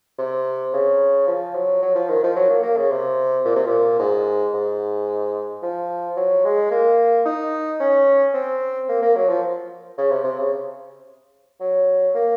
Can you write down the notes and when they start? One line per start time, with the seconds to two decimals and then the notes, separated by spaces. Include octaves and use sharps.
0.18 C3
0.73 C#3
1.27 F3
1.55 F#3
1.82 F#3
1.95 F3
2.09 D#3
2.23 F3
2.36 F#3
2.50 A#3
2.63 A#3
2.77 C#3
2.91 C3
3.45 A#2
3.56 C3
3.66 A#2
3.99 G#2
4.54 G#2
5.62 F3
6.17 F#3
6.44 G#3
6.71 A#3
7.25 D#4
7.80 C#4
8.34 C4
8.89 A#3
9.02 A#3
9.16 F#3
9.29 F3
9.98 C#3
10.11 C3
10.24 C3
10.38 C#3
11.60 F#3
12.15 A#3